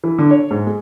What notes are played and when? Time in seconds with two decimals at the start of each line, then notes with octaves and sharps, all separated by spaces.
0.04 E3
0.18 D3
0.31 C#5
0.51 G#2
0.67 G#3